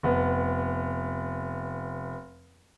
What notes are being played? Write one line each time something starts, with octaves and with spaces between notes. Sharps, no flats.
F1 B3